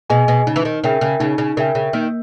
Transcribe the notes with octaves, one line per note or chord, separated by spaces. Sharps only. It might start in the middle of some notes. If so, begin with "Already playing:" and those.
B2 G#4 D#5 G#5
B2
C#3 D#4
E3
D#3
C#3 A#4 E5 G5
C#3
C#3 D#4
C#3
C#3 A#4 E5 G5
C#3
D#3 A#3